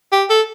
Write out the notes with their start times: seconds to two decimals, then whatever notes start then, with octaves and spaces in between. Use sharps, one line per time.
0.12 G4
0.30 A4